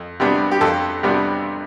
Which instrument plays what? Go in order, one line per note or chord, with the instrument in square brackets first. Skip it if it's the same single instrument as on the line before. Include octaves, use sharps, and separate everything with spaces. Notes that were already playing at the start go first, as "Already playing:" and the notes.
Already playing: [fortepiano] F2
C3 G3 B3 D4
G4
F2 A4
C3 G3 B3 D4